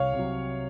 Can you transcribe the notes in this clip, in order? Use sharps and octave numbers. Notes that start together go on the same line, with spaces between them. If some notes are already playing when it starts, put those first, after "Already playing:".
Already playing: C2 C#5 F5
C3
F#3